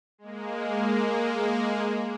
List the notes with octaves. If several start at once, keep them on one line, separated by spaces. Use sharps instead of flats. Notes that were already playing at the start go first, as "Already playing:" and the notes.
G#3 A#3